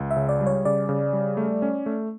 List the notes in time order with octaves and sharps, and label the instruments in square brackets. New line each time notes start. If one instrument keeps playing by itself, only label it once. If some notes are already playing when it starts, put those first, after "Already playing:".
Already playing: [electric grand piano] C#2
[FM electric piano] E5
[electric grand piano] C#3
[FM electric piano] D5
[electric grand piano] G3
[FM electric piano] C#5
[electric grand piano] C#3 [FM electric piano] D5
[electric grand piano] C#3
G3
A3
C#4
A3